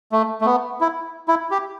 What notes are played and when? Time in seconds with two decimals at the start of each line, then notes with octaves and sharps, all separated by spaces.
0.12 A3
0.41 A3
0.46 B3
0.81 E4
1.28 E4
1.51 G4